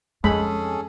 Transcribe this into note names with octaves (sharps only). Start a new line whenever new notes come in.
F2 G#3 C#4 G#4 A4 B5